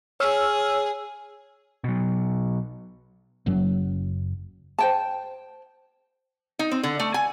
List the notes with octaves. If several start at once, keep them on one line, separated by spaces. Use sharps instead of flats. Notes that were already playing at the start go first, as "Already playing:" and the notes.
G#4 C#5 E6 F6
B2 F#3
F#1 F#2 F#3
C5 G5 A5
D#4
C4
D3
A3
G#5